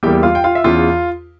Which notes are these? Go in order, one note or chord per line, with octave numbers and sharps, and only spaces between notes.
E2 E3 G3 A#3 G4 G5
F4 F5
G5
F4 F5
E5
E2 C#3 E3 F4 F5